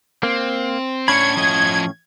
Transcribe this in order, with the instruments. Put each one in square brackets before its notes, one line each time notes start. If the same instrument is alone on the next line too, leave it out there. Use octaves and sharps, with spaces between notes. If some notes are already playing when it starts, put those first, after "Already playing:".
[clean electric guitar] A#3 [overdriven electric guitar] C4
[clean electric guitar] A2 C#4 B5 [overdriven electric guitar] D4 C#5 [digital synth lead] G#6
[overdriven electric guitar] F3 D#5